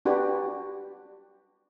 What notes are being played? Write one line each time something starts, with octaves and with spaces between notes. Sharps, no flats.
D4 F#4 G4 B4